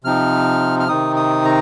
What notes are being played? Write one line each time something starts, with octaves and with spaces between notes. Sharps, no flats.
C3 F3 C4 D#4 F6
F6
C3 D#3 C4 D#4 D#6
D#6
A#5